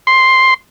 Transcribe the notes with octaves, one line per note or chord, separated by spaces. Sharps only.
C6